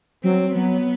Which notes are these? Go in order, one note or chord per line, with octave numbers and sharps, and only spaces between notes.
F#3 C4
F#3 B3